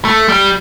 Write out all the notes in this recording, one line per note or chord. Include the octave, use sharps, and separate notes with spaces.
A3
G3